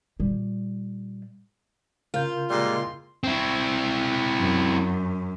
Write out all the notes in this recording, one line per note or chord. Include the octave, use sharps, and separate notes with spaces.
A#2 G3
C#3 F4 A#4 G6
A#2 G3 G#3 C6
C4 E4
F#2